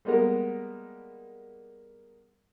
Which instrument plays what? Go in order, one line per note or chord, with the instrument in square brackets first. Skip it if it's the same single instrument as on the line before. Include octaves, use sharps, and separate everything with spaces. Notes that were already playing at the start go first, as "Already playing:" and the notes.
[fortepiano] G3 G#3 A#3 B3 A#4